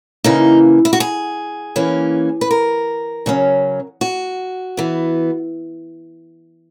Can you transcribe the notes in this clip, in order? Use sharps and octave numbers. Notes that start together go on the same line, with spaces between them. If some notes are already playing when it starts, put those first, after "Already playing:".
C#3 E3 A#3 D#4
E4
F#4
G#4
E3 A#3 C#4
B4
A#4
C#3 F#3 C#4
F#4
E3 B3